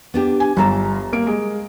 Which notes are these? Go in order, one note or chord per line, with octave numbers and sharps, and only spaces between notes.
B3 D4 G4
G#5
G1 G3 A4 E5 A#5
A#3 D7
G#3